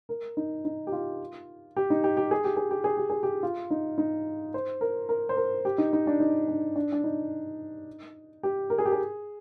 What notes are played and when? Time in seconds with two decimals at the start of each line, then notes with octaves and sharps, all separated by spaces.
0.09 A#4
0.37 D#4
0.65 D#4
0.87 G4
0.92 F4
1.76 G4
1.90 D#4
2.04 G4
2.17 G4
2.31 G#4
2.44 G4
2.57 G#4
2.71 G4
2.84 G#4
2.97 G4
3.10 G#4
3.23 G4
3.43 F4
3.71 D#4
3.98 D#4
4.54 C5
4.81 A#4
5.09 A#4
5.29 C5
5.37 A#4
5.65 G4
5.78 D#4
5.93 D#4
6.07 D4
6.20 D#4
6.48 D4
6.76 D4
6.92 D4
7.04 D#4
8.43 G4
8.70 A#4
8.78 G#4
8.86 G4
8.93 G#4